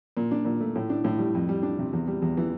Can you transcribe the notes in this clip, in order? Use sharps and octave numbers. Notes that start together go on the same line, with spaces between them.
A#2
D4
A#2
A3
A2
D4
A2
G3
F2
G3
D4
C3
E2
G3
E2
E3